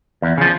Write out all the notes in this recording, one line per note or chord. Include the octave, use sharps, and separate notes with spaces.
E2
C#3 F3